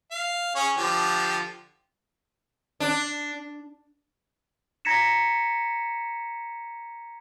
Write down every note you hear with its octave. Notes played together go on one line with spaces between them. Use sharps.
F5
C#4 G#4 C#5
D3 F3 G4
D4
A#5 G#6 A#6 B6 C#7 E7